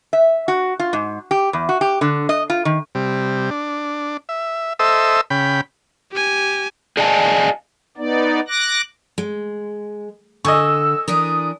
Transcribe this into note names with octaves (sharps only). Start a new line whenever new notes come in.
E5
F#4
F4
G#2
G4
E2
F#4
G4
D3
D#5
F4
D#3
C3 G3
D4
E5
A4 C5 D#5 E5 E6
C#3 G5 B5
G4 G#5
G#4 D5 D#5 F5 G#5 A5
B3 D#4 D5
D6 F#6 A#6
G#3
D3 D#5 G#5 C#6 E6
E3 D4 A#4 D#6